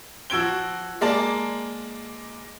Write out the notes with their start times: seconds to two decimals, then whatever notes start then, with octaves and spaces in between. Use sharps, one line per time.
0.30 F3 F#4 E6 G#6 D7 G7
1.01 G#3 A#3 D5 A5